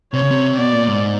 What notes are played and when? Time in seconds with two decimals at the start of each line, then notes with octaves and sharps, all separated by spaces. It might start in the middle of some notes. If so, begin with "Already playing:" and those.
0.13 C3 C#5
0.22 C#3
0.31 C3
0.58 B2 D5
0.73 A#2
0.87 G#2